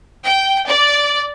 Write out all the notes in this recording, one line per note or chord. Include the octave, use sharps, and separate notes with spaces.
G5
D5